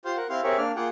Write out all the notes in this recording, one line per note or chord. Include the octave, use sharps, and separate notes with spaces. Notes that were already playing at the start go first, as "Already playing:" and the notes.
F4 G4 C5 F5 C6
A#4 F#5
C4 E4 G4 F5 C6 F6
C4 G4 G#4 A#4 C#5 E5
A#3 D4 D5 F6
A#3 F4 G#4 F#5 G5